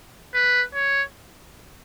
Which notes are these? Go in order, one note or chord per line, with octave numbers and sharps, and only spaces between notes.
B4
C#5